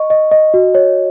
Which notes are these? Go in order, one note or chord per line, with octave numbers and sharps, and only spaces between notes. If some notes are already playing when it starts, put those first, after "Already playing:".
Already playing: D#5 C#6
D#5
D#5
F#4
C#5